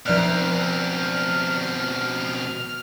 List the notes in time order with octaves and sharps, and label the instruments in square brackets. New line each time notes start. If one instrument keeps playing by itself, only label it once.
[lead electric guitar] B2 C4 [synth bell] F3 D5 F#6 [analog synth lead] F6